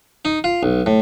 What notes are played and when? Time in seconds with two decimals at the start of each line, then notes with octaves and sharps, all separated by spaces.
0.25 D#4
0.44 F4
0.63 B1
0.86 A2